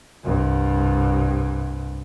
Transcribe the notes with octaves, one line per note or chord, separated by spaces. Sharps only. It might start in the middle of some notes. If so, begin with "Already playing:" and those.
C2 G2